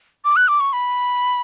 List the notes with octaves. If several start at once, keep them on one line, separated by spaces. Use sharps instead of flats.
D6
F#6
D6
C#6
B5